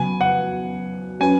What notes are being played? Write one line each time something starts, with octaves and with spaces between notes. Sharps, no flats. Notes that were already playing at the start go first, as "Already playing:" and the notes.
Already playing: C#3 F#3 B3 F#4 B4 G#5
F#5
F#3 C#4 F#4 B4 G#5